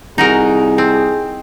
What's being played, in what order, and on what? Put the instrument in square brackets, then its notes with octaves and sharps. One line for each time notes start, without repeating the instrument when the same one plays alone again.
[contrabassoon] C2 [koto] D#4 F#4 A#4 [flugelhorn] G#4
[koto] C4